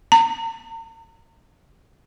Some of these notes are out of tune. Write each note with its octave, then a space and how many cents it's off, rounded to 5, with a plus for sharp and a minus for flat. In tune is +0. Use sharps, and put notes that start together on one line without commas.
A#5 -45